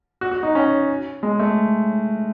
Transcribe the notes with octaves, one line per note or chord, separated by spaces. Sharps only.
F#4
F#4
D#4
C#4
G#3
A3